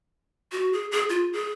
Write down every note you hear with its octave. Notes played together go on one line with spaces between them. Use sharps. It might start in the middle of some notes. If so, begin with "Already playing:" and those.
F#4
G#4
G#4
F4
G#4